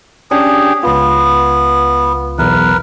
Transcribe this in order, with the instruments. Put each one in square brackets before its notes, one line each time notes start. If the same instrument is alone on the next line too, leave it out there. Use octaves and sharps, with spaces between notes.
[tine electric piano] C#4 D4 [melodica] G4 G#4
[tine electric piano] C#2 F4 [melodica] B3
[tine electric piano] B1 E2 [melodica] A#4 B4